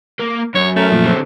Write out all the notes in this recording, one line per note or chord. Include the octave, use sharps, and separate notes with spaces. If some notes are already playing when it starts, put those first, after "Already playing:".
A#3
F#2 C#5
A3 C#4 A#4
F#2 A#2 F3
D3 C4